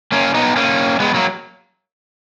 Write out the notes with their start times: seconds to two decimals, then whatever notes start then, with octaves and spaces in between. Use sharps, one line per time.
0.12 A#3 C#4
0.34 B3 D#4
0.56 A#3 C#4
1.00 G#3 B3
1.14 F#3 A#3